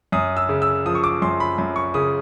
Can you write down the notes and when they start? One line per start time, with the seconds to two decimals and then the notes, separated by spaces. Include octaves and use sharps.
0.12 F#2 D#6
0.37 E6
0.49 C#3
0.62 E6
0.86 F3 D#6
0.95 C#6
1.04 D6
1.22 F#2 C6
1.40 B5
1.58 F#2 B5
1.76 C#6
1.94 C#3 D#6